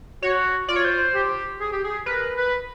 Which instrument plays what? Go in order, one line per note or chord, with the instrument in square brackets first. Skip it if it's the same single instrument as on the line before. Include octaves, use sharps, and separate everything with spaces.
[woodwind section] F#4 [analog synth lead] C#5
[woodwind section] F4 [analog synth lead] D5
[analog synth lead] C#5
C5
[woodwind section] G4
G#4
G4
G#4
[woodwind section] A#4 [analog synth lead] B4
[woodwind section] B4